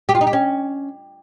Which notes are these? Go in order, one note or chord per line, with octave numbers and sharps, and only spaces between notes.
G4
F4
D#4
G4
C#4